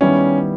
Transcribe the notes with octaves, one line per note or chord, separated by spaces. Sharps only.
D#3 G3 B3 C#4 E4